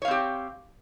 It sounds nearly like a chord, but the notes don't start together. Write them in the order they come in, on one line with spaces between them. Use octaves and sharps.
C#5 F5 C4 G4